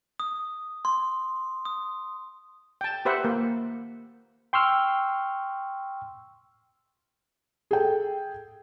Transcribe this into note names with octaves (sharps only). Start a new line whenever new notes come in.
D#6
C6
D#6
G5 A5
G4 B4 C5 E5 F#5
A#3
G5 C6 C#6 E6 F6
G#4 A4 G5